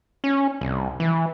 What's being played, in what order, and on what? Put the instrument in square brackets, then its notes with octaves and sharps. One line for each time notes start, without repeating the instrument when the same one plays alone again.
[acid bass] C#4
C2
E3